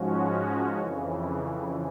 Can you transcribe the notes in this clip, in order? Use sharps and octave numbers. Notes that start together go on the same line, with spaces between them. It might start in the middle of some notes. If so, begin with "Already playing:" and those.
Already playing: G#2 F3 G#3 C#4 F#4
F2 C#3 E3